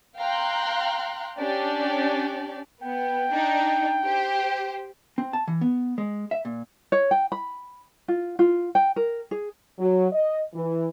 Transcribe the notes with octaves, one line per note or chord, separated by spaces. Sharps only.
F5 G5 A#5 C6 F#6
C#4 D4 G4 D5
B3 G5
D4 D#4
G4 C5
C4
A5
E3
B3
G#3
E5
A#2
C#5
G5
B5
F4
F4
G5
A#4
G#4
F#3
D#5
E3